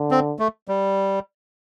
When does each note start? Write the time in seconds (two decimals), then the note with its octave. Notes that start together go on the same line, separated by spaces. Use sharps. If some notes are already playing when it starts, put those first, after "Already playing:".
Already playing: D3
0.11 C4
0.39 A3
0.68 G3